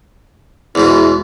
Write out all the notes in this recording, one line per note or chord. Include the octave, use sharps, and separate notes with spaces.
E2 G#2 B2 E4